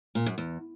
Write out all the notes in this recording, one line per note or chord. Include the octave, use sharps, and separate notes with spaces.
A#2
F#2
E2